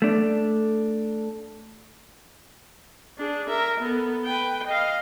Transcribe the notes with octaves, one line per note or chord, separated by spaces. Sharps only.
A3 D4
D4 G#4
A#4 E5
B3 A4
B4 G5
D#5 F5